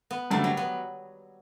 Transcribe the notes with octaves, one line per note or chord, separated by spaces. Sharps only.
B3
F#2 D3 G3 A3
F#3
B3